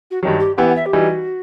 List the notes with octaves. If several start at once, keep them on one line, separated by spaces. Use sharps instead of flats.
F#4
G2 D#3 F#3
G4
E3 B3 E4 G4 F#5
F#5
E5
G4
E3 G3 D#4 F#4